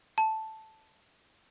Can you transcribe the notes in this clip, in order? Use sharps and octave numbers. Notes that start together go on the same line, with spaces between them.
A5